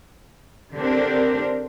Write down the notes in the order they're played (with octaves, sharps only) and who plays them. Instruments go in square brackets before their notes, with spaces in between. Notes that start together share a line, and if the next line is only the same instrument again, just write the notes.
[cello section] D3 C4 D4 G4 A#4